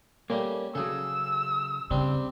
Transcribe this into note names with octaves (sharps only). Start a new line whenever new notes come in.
G3 A3 A#3 C#4
C#3 F#3 G#4 A4 E6
C#3 G3 C4 D4